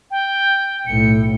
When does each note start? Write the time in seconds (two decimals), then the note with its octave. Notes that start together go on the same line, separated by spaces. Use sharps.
0.11 G5
0.87 B1 A2 C#7